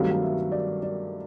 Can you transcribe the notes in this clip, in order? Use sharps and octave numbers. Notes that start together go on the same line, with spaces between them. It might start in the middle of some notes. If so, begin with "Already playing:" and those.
Already playing: G2 D#3 F#3 A3 C4 F5
F5
E5
D5
D5